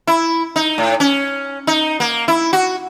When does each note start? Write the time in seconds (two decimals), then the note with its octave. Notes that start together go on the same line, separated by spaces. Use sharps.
0.07 E4
0.56 D#4
0.78 A2
1.00 C#4
1.67 D#4
2.00 A#3
2.28 E4
2.53 F#4